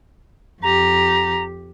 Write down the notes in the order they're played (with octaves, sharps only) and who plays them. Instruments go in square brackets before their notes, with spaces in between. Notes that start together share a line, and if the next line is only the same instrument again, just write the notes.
[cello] F2 G4 [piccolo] A#5